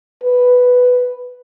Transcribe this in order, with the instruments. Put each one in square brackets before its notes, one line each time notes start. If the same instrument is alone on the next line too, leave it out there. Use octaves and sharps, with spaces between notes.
[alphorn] B4